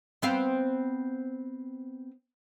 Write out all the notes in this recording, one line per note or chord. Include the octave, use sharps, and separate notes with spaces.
B3 C4 F5